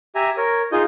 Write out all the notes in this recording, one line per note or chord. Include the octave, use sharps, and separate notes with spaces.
G4 E5 G#5 A#5
A#4 C#5
D#4 F4 G#4 D#5 G6